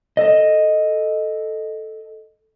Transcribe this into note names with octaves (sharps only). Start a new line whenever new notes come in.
A4 D#5